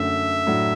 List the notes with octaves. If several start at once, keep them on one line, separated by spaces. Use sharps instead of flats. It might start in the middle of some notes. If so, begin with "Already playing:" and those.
Already playing: F#2 D3 A3 E5
A2 F#3 D4